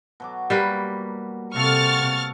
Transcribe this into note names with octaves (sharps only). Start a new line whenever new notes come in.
B2 F#3 D6
G3 A#3 B4
C3 F#4 A4 F5 C#6 F6 A6